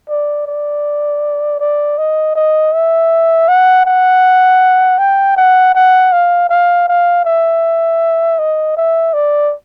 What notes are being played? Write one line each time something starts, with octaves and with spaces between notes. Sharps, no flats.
D5
D5
D5
D#5
D#5
E5
F#5
F#5
G5
F#5
F#5
F5
F5
F5
E5
D#5
E5
D5